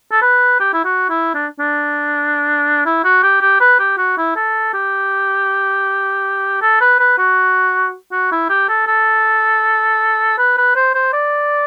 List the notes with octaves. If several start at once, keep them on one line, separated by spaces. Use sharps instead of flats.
A4
B4
G4
E4
F#4
E4
D4
D4
E4
F#4
G4
G4
B4
G4
F#4
E4
A4
G4
A4
B4
B4
F#4
F#4
E4
G4
A4
A4
B4
B4
C5
C5
D5